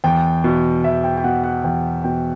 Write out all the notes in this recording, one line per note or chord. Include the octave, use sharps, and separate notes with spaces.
E2 G5
B2
E2 E5
G5
G5
B2 F#5
F#5
E2 G5
B2 G5